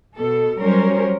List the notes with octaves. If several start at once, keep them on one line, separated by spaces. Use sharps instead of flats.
B2 A4
F#3 G3 C#4 A#4 C5 C#5